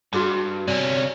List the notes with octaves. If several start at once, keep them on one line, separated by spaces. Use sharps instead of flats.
G2 F#4 G#4 A5
C3 C#4 D5